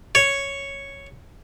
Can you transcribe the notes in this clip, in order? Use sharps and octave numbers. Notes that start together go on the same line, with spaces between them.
C#5